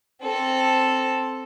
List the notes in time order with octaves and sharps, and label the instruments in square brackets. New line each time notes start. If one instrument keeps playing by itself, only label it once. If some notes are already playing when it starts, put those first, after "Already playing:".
[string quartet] C4 A4